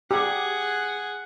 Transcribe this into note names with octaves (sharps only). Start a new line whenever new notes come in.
G4 G#4 F#5